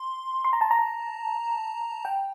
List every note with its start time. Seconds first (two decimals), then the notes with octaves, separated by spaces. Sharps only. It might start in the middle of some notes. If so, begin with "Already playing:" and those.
Already playing: C6
0.45 C6
0.53 A#5
0.61 A5
0.71 A#5
2.05 G5